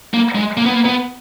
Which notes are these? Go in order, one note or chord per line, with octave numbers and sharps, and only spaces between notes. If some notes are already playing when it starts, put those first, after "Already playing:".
A#3
G#3
A#3
B3
A#3
B3